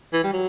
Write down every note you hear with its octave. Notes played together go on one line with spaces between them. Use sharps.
E3
G3
F#3